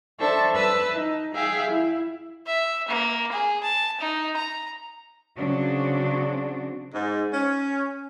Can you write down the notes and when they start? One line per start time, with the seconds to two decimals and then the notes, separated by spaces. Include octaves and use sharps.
0.19 D4 A4 C5 E5 C#6
0.55 B4 E5 A5 E6
0.92 D#4
1.34 G#4 E5 F5 G5
1.71 E4
2.46 E5
2.88 A#3
3.32 G#4
3.63 A5
4.00 D#4
4.36 A#5
5.37 C#3 F#3 C4 D4 F#4
6.93 G#2
7.34 C#4